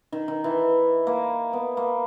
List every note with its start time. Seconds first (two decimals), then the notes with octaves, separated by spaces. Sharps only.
0.12 D#3
0.28 D#3
0.44 E3
1.07 A#3
1.53 B3
1.77 A#3